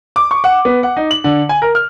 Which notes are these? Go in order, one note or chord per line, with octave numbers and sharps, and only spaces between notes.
D6
C#6
F#5
B3
F#5
D#4
F#7
D3
G#5
A#4
F6